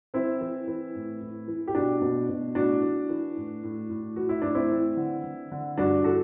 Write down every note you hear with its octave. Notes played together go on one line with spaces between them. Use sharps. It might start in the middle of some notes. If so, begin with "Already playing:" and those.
E3 C4 E4
E3
E3
A2
A2
E3
G4
B2 D4 F#4
B2
B2
A2 D4 F#4
E3
E3
A2
A2
A2
E3 F#4
E4
A2 D4
C4 E4
E3
D3
D3
D3
G2 D4 F#4
E3 F#4 A4